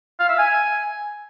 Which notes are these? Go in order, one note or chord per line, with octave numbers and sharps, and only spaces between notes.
F5
E5
G#5